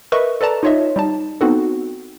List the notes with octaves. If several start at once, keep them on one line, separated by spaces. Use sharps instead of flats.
A#4 B4 D#5 E5 C#6
A4 B4 D5 A5 A#5
D#4 F4 C#5 D#5 E5
G3 D#4 A5
B3 C4 D#4 F#4 A4